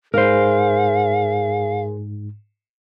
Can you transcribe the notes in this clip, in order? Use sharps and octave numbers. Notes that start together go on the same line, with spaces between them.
G#2 G#4 A#4 C5 F5